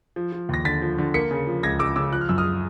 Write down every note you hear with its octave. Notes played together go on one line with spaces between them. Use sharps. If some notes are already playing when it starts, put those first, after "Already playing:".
F3
F3
D#2 A#6
D3 A6 B6
F3
D3
A#3 B6 C#7
C#3
F3
C#2 G#6 A#6
C#2 D6 E6
C#3 D6 E6
F3 F#6
F6
F#2 E6
D#6 F6